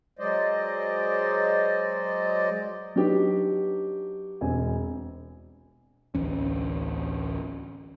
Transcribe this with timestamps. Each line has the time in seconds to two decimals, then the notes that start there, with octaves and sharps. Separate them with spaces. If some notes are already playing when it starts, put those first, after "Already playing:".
0.19 F#3 G#3 C5 D5 D#5
2.96 F#3 D4 D#4 G4 B4
4.41 E1 C4 G#5
6.15 A1 D2 E3 C#4